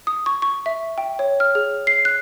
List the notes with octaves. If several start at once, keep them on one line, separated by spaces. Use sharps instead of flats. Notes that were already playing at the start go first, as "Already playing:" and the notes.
D#6
C#6
C#6
E5
G5
C#5
F6
G#4
C7
F#6